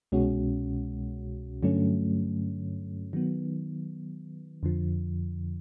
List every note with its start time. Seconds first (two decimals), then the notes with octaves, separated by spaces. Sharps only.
0.12 C2 B2 G#3 C#4 F#4
1.63 G2 D3 F#3 A3 C#4
3.13 D#3 F#3 B3
4.63 F2 D3 F3